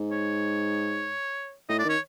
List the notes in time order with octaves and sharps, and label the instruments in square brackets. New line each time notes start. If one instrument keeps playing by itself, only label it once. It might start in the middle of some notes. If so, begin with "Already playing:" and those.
Already playing: [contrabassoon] G#2
[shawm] C#5
[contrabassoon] A2 [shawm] D#5
[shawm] D5
[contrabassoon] D#3 [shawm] C#5